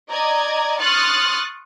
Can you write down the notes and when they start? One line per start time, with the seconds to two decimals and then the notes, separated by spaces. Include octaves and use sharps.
0.10 D5 D#5 A#5 D6 G#6
0.80 C6 C#6 D#6 F6 F#6 A6